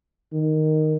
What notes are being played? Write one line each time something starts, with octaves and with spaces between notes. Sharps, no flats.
D#3